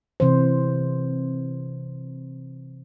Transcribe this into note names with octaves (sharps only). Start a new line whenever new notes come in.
C3 E3 C5